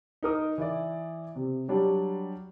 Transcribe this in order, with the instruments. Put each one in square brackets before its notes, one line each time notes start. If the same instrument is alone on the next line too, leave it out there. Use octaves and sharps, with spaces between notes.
[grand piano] D#4 A#4 D#6
E3 E4 D5
C3
F#3 G3 D4